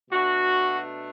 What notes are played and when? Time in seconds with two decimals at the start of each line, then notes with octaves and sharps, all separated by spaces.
0.10 B2 A3 D4 F#4